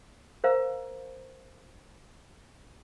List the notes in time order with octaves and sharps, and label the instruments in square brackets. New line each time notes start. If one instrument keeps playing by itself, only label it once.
[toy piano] A#4 C5 F5 A#5